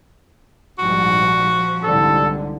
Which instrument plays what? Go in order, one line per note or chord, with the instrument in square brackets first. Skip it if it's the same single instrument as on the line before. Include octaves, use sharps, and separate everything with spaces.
[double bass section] A#1 G#2 G3 [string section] F3 [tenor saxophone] F#4
[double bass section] C2 G#2 D3 [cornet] A4